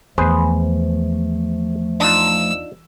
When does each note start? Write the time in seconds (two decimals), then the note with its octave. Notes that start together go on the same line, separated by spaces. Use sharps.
0.18 E2 F3 A3 G#4 B4 C5
2.00 D4 D#4 F4 E6